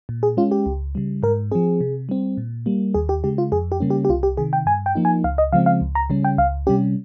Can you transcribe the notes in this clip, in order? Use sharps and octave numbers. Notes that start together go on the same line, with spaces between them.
A#2
G#4
G#3 C#4 F4
G4
C#2
C#3 G3
G#2 A#4
F3 C4 G#4
C3
G3 C4
A#2
G3 A#3
D#2 G#4
G4
C#3 G#3 G4
F4
F2 G#4
G4
C#3 G3 A#3 C#4
G4
G4
C2 F4
G4
C3 D#3 G#4
G5
G2 G#5
G5
F3 A#3 D#4
G#5
C#2 F5
D#5
C#3 F3 G#3 C4 F5
F5
C#2
A#5
C#3 G3 C#4
G5
C#2 F5
C3 G3 C#4 G4